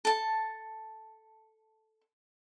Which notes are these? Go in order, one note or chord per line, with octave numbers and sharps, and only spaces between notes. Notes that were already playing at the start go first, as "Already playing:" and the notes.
A4 A5